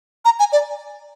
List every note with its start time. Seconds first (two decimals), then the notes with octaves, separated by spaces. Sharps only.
0.25 A#5
0.39 G#5
0.52 D5